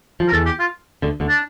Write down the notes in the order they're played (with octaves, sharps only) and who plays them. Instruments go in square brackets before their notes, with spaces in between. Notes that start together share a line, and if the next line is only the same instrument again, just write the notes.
[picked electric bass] F3
[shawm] A#4
[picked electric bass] E2 E3 [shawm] A4
[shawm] G4
F4
[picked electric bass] D2 D3
D2 D3
[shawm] D4